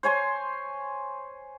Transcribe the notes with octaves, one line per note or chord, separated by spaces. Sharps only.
C5 C#5 G#5 C6